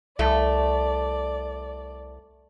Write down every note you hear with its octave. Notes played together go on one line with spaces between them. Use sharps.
C2 A3 D5